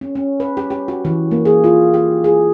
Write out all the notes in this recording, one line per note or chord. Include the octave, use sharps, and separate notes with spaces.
C#4
C#4
B4
G4
G4
F#4
E3
A#3
G#4
F4
G4
G#4